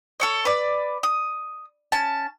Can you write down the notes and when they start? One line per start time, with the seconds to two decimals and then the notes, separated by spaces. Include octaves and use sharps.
0.20 A4 C#5 D#5
0.45 B4 D5
1.03 D#6
1.92 C#4 A5